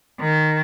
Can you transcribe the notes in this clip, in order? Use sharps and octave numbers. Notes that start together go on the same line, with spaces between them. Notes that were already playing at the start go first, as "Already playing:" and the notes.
D#3